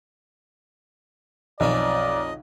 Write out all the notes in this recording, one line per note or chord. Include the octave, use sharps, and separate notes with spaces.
B1 F2 C#4 D4 D5 D#5